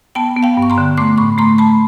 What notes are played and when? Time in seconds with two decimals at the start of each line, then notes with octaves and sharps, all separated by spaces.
0.15 B3 G5 A5
0.36 B3
0.43 F5 G5
0.57 G2
0.62 C#6
0.70 A#5 C6
0.78 D3
0.97 A3 C6 D6
1.18 A2 B5 C#6
1.38 A3 A#5 C6
1.58 A3 A5 B5